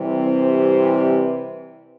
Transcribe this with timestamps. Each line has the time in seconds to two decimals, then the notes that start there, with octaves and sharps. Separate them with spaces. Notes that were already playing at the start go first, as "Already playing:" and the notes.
Already playing: C3 E3 G3 C4
0.23 C5
0.99 B4